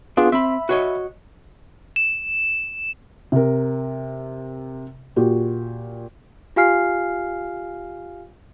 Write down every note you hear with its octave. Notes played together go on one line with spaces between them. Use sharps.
B3 D4 F4 G#4
C4 E5 B5
F#4 C#5 D#5
E7
C3 A#4
A#2 F#4 G4
F4 G4 F5 G#5 F6 C7